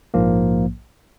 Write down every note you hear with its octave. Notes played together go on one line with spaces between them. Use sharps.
A#1 G#2 F3 A#3